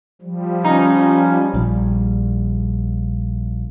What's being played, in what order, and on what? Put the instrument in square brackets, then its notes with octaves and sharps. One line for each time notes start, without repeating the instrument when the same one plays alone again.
[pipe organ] F3 G3
[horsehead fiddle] C#4 [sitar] D#4
[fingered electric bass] A#1 G3